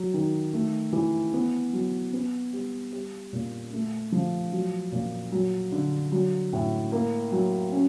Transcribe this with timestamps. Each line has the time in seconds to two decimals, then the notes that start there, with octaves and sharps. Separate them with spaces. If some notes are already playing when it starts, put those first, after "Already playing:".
Already playing: F#3
0.14 D#3
0.53 A3
0.93 E3
1.33 B3
1.73 F#3
2.13 B3
2.53 G3
2.92 G3
3.33 A#2
3.73 A3
4.12 F3
4.52 F#3
4.92 A#2
5.32 F#3
5.72 D3
6.12 F#3
6.53 A2
6.92 A#3
7.32 F#3
7.72 C#4